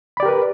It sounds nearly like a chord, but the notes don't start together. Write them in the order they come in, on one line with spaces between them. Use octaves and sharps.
B5 D5 G4 A#4 B4